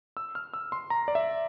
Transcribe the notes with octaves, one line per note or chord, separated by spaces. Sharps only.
E6
F6
E6
C6
A#5
D5
E5